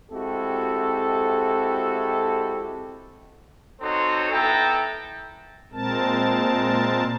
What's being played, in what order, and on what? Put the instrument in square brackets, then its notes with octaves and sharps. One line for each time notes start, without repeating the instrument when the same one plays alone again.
[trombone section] G#3 C4 E4 F#4 G4 A4
[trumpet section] C4 D#4 F#4 A4 C5 C#5
B3 E4 A4 G5 A5 A#5
[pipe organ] A#2 G#3 C4 A#4 A5